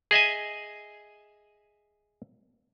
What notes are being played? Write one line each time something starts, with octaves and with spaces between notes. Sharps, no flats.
G#4 D#5 E5 G#5